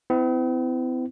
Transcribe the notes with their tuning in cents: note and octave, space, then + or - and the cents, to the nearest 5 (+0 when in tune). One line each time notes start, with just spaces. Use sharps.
C4 -45 E4 +0